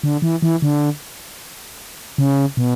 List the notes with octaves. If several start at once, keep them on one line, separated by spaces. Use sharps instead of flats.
D3
E3
E3
D3
C#3
B2